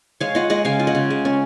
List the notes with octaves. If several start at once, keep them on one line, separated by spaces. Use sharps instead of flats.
G#3 C#5 F5
F4 D#5 F#5
G#3 D#5 F#5
C#3 F5 G#5
F4
D#5 F#5
C#3
G#3
C#4